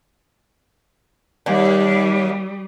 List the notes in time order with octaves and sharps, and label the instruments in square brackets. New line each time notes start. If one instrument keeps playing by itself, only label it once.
[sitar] D#2 [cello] G3